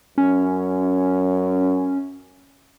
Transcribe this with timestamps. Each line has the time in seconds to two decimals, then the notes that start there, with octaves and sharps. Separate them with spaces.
0.18 F#2 C#4